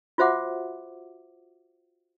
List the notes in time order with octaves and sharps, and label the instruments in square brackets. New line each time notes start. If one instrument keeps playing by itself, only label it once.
[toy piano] F4 F#4 C5 E5 F#5 D6